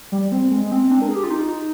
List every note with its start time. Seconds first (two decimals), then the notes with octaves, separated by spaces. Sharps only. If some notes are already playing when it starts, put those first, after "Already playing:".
0.12 G3
0.32 C4
0.52 G#3
0.72 C4
0.91 D4
1.02 A#4
1.08 G#4
1.16 G4
1.24 F4
1.30 D#4